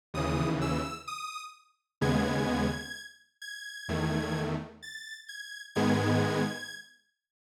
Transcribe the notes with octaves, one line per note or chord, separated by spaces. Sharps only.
D#2 C#3 E3 D#6
E6
D#6
D#2 C#3 G#3 B3 G#6
G#6
E2 D#3 A3
A6
G#6
G#2 D#3 G#3 B3 G#6